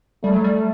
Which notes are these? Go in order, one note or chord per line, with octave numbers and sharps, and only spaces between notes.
G3 A3
F#3
G3